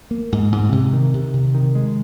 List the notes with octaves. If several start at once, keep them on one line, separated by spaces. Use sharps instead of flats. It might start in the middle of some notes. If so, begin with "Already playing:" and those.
A#3
G#2
G#2
C3
D#3
C3
C3
D#3
G#3